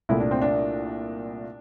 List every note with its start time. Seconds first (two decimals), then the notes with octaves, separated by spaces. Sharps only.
0.09 C2 A#2 A3 E4
0.20 D4
0.31 C4
0.42 D4